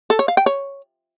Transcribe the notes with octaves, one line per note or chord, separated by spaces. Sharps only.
A4
C#5
F5
G5
C#5